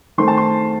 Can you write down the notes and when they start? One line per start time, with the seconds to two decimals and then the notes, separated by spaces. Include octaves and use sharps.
0.18 D#3 A3 C4 C6
0.28 A5
0.38 C6